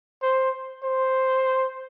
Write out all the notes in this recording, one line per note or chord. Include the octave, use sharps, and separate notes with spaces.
C5
C5